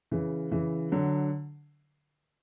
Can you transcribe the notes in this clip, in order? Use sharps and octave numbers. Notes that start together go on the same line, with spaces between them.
C#3 E3
C#3 E3
D3 F#3